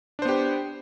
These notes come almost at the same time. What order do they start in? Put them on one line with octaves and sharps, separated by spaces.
D4 C5 B3 G4